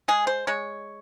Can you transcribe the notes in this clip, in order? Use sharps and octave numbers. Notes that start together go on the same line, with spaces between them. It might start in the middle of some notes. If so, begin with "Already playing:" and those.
G#3 G#4
C5
G#3 C#5